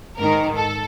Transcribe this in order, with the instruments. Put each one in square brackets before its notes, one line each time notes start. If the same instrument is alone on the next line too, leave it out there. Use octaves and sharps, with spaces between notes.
[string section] G#2 D#3 A#4
A4